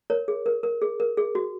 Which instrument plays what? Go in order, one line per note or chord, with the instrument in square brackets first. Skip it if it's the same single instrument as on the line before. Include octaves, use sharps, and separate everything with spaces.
[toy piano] A#4 C#5
G#4
A#4
A#4
G#4
A#4
G#4
F#4